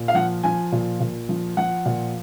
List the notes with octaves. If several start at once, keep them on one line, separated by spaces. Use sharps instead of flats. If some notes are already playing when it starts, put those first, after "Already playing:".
Already playing: A#2
F5
F3 F#5
F3 G#5
A#2
A#2
F3
F3 F#5
A#2